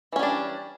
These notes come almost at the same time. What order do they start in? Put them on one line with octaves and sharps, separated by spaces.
E3 C#4 G3 D4